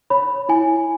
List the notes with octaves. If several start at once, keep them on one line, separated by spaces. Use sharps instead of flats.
C#5 B5
E4 G#5